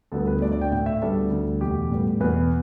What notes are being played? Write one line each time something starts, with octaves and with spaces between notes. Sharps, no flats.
D2 D3 G3 B3 A4
B4
D2 D3 A3 D5
D5
G5
A2 A3 G5
E5
D2 D3 G3 B3 A4
D2 D3 G3
E2 B2 A3 G4
A2 G3 B3
E2 B2 B3 B4